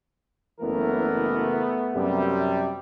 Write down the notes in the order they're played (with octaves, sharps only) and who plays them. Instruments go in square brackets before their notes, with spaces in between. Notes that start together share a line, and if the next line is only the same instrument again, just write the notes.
[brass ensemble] F#1 E3 A#4 [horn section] A3 B3
[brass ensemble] F#2 C3 G3